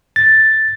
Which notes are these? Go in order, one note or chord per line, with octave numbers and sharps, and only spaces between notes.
A6